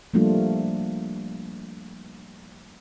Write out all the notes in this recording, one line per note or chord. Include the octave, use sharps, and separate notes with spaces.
F3 G3 A3 A#3 D4 F4